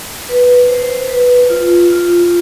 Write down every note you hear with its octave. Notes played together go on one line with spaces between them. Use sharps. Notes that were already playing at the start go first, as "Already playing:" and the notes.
B4
C5
B4
F4
F4
F4